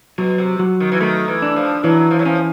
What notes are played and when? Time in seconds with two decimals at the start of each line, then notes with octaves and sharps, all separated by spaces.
0.18 B2 F#3
0.38 C3
0.59 F#3
0.80 D#3
0.92 E3
1.00 D#3 A3
1.28 E3
1.42 D4
1.56 F3
1.83 E3 F#3
2.11 F3
2.19 F#3
2.25 F3 C#4